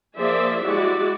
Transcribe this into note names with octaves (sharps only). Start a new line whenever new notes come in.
F3 A#3 G#4 C5 D5 E5
G3 G#3 E4 F#4 D5